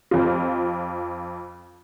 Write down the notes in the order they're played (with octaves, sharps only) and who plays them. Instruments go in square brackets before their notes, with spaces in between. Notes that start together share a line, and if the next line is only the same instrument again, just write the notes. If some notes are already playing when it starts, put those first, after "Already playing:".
[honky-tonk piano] F2 F4